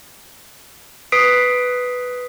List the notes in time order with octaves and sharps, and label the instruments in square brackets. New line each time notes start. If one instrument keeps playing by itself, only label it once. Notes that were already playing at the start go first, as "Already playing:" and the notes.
[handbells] B4 D#6 B6 C7 D7